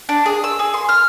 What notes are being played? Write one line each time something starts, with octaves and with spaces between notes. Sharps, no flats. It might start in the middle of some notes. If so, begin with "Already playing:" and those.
D4
G#4
E6
G#4
C6
F6